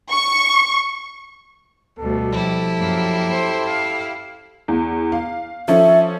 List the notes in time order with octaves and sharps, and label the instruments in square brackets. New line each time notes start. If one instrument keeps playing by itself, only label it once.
[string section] C#6
[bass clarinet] D2 [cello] B2 G3 [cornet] A4
[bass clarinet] F3 [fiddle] E4 G4
[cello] F#2 A#3
C5
F5
[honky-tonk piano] E2
F5
[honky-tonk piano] F3 C#4 A4 [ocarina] E5